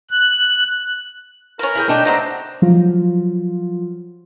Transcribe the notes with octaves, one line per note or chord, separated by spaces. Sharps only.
F#6
C#4 A#4 B4
E4 G#4 G5
A3 D4 D#4 G5
C3 B3 C4 A#5
F3 F#3 F4